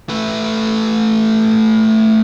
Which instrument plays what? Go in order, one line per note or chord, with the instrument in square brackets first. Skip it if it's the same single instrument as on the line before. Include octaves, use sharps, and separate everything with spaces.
[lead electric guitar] A3 B4